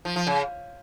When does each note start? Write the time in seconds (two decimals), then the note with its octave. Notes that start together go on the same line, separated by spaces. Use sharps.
0.05 F3
0.16 F3
0.27 C#3